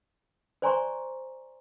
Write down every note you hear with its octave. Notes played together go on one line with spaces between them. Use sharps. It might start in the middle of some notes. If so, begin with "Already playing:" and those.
C5 D5 G#5 A#5 C6 C#6